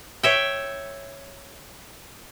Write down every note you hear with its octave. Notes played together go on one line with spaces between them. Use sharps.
C#5 E5 G5